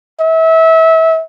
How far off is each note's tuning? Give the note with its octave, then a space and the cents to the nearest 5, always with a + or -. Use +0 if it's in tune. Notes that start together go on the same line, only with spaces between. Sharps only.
E5 -30